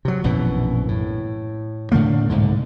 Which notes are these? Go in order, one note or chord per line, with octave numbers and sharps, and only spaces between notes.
C3 F#3
A#1 F#2 B2 E3
A2
A2 D3 A3 A#3
C2 G#2 D3